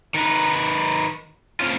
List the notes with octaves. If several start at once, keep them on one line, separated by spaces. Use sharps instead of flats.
D#3 D#4 B4
A2 C4 C#4 F4